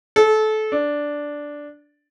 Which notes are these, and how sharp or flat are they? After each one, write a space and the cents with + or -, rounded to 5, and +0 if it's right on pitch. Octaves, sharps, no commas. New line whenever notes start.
A4 -25
D4 -5